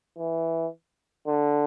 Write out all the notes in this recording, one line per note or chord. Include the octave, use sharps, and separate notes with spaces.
E3
D3